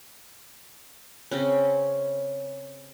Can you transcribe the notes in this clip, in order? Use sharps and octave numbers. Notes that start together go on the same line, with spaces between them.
C#3 C4 C#4